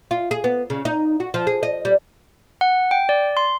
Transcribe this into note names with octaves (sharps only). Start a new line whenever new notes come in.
F4
G#4
B3
C#3
D#4
F#4
F3
G#4
D#5
G3
F#5
G5
D5
C6